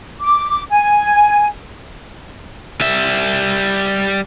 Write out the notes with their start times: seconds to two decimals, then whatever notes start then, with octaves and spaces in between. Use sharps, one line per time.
0.20 D6
0.70 G#5
2.81 G3 E5